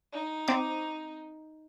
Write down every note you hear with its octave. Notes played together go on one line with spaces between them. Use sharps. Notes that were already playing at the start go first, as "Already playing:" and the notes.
D#4
C4 D6